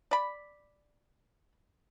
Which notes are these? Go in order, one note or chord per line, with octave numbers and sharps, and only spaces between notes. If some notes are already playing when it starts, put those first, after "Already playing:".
D5 B5